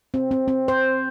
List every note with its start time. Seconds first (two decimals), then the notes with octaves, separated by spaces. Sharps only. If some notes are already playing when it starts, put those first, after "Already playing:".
0.14 C4
0.31 C4
0.48 C4
0.68 C5